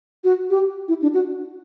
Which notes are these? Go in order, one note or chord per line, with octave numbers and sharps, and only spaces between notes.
F#4
G4
E4
D4
F#4